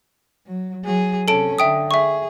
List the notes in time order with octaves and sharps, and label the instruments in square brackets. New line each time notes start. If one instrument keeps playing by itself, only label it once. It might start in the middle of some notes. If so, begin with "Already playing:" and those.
[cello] F#3
F#3 G#4
[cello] C3 C#4 [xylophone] A4 A5 D7
[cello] D3 [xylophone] E5 G5 D#6
[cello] G#4 [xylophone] E5 C#6